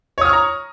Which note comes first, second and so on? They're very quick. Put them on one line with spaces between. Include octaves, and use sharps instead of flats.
C#5 D#6 F6 C#6 A#5